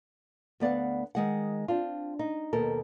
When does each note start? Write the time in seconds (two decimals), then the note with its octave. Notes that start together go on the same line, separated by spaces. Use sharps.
0.60 D2 B3 D5 F5 F#5
1.15 D#3 G#3 F#5
1.68 C4 D4 F4
2.19 D#4
2.53 D#2 B2 A4 A#4